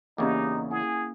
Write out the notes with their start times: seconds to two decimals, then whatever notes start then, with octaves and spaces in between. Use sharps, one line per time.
0.18 E2 C#3 A#3 C#4 D#4 G4 D#5 D6
0.71 E4 G#4 F#5 G#5